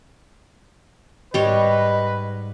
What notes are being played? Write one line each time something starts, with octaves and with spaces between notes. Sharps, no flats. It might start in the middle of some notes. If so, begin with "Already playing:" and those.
G#2 G3 B4 C#5 D#5 G#6